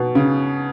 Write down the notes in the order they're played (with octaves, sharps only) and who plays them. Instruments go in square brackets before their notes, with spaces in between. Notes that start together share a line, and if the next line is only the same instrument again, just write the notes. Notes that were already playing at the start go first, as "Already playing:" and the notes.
Already playing: [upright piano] B2
C#3